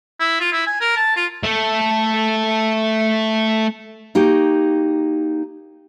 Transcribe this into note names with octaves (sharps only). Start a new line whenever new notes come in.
E4
F4
E4
G#5
A#4
A5
F4
A3 A4
A#3 D#4 F#4 G4